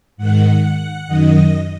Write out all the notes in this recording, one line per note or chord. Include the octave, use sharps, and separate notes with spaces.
G#2 D#3 F#5
F#2 D#3 D#5